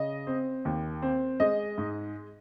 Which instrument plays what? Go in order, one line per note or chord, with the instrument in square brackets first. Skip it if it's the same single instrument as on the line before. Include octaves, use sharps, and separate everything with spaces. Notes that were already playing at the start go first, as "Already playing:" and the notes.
Already playing: [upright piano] C#3 D#5
C4
D#2
C4
G#3 D#5
G#2